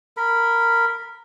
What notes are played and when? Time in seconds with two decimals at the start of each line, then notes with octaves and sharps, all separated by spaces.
0.17 A#4 B5